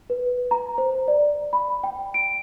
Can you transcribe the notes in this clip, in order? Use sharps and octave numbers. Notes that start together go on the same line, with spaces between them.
B4
A#5
C5
D5
B5
G5
D7